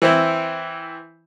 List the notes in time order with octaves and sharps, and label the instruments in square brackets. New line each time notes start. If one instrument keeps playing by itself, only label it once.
[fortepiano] E3 C4 E4